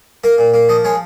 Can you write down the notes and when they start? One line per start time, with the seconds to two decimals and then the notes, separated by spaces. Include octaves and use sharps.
0.24 A#3 A#4
0.38 A#2
0.54 A#3
0.69 F3 D#5
0.84 G#3 C#5